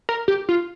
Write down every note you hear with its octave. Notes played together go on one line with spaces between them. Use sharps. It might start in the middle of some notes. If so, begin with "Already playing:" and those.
A#4
G4
F4